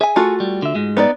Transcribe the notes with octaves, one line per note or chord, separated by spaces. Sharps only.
G#4 E5 G#5
A3 F4 F#4
G3
D3 E5
G#2 G#3
B3 D#4 D5